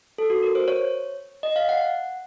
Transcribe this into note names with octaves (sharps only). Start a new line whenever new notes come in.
A4
F#4
A#4
C5
C#5
D#5
F5
F#5
F#5